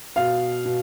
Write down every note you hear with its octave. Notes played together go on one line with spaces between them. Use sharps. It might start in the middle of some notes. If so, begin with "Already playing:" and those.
B2 F5
B2